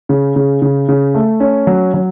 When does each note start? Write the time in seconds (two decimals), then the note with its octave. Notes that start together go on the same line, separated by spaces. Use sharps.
0.09 C#3
0.36 C#3
0.62 C#3
0.89 C#3
1.14 A3
1.40 C#4
1.67 F#3
1.94 F#3